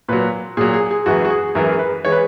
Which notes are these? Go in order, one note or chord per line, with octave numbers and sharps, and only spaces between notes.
A#2 F#3 B4
A#2 F#3 G#4
G#4
G#4
F#2 E3 G#3 F#4
F#4
G#4
F#2 E3 G#3 A#4
B4
E3 G#3 C#5
B4